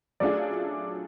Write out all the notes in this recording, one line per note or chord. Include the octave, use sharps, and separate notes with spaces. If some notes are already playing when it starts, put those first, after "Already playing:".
F#3 A3 D4 F4 G#4 D5